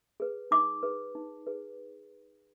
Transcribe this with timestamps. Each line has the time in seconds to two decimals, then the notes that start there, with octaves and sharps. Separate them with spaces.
0.20 G#4 B4
0.51 D#4 D6
0.83 G#4 B4
1.15 D#4
1.47 G#4 B4